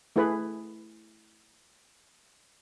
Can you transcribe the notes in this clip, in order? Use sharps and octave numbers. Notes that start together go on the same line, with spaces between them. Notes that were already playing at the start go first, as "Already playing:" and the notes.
A3 E4 G#4 B4